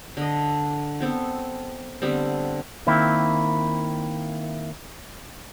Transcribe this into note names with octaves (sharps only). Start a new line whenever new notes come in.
D3 D#5
B3 C4 A4
D3 G3 B3 C4
D#3 A#3 C4 E4